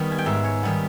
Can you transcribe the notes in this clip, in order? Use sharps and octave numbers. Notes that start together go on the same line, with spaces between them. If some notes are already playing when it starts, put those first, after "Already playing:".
Already playing: D#3 G3 B3
G#5
G5
G#2 E5
C#5
D#3 G3 B3